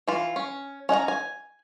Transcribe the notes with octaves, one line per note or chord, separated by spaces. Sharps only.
E3 F4
C#4
C#4 D#5 F#5 A#5
G#5